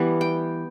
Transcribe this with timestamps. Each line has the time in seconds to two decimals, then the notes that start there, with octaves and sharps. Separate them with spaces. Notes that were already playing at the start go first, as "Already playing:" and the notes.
Already playing: E3 G3 B3 F#5
0.21 G5